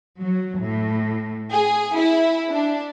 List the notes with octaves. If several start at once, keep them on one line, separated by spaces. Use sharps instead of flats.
F#3
A2
G#4
E4
D4